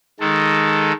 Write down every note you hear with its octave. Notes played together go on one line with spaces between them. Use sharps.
D#3 G#3 A4